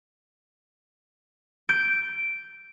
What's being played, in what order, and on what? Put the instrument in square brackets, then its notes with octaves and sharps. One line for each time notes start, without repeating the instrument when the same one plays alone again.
[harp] G6 D7